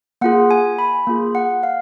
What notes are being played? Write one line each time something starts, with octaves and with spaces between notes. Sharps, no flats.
A#3 F4 G#4 F#5
G#5
B5
A#3 F4 G#4
F#5
F5